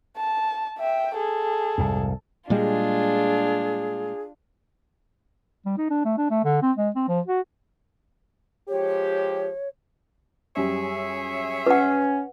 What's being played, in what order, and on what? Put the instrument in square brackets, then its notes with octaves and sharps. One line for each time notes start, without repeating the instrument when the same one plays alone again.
[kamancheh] A5
E5 G5
G#4 A4
[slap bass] C2 F2 G#2
[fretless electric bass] A#2 G3 G#3 [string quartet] D4 F4 [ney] G#4
[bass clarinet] G3
D#4
D4
A3
D4
A3
D3
C4
G#3
C4
F3
F#4
[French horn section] F3 G#3 G4 [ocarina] C#5
[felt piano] F#2 G3 [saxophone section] G#4 C#5 E5
[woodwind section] C#4 [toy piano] B4 F#5